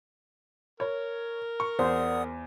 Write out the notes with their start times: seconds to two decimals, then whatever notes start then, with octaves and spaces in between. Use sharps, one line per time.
0.80 A#4 C#5
1.60 C#6
1.79 E2 C5 D5 F#5 D#6